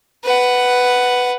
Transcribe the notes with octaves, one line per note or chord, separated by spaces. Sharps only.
B4 F#5